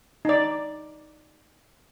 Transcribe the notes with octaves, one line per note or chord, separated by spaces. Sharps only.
D#4 D5